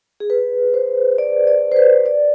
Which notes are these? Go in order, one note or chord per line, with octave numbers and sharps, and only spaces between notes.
G#4
B4
C5
D5
D5
C5
B4
D5